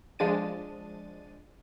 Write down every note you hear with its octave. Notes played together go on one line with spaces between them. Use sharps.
F3 G#3 D4 A6 D#7